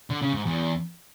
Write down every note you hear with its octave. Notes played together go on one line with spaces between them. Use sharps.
D3
C#3
G#2
E2